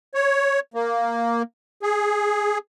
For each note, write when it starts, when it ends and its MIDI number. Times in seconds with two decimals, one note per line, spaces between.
0.14 0.60 73
0.74 1.42 58
1.83 2.58 68